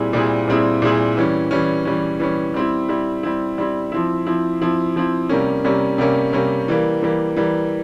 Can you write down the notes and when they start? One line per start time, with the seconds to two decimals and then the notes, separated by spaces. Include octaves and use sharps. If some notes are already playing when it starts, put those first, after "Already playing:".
Already playing: A#2 G3 C4 E4 G#4
0.13 A#2 G3 C4 E4 G#4
0.48 A#2 G3 C4 E4 G#4
0.82 A#2 G3 C4 E4 G#4
1.17 E3 G3 C#4
1.51 E3 G3 C#4
1.85 E3 G3 C#4
2.20 E3 G3 C#4
2.54 G3 C4 E4
2.89 G3 C4 E4
3.23 G3 C4 E4
3.58 G3 C4 E4
3.92 F3 C4 E4
4.26 F3 C4 E4
4.62 F3 C4 E4
4.96 F3 C4 E4
5.29 C3 G3 A#3 C#4
5.64 C3 G3 A#3 C#4
5.98 C3 G3 A#3 C#4
6.33 C3 G3 A#3 C#4
6.68 E3 G3 A#3
7.02 E3 G3 A#3
7.36 E3 G3 A#3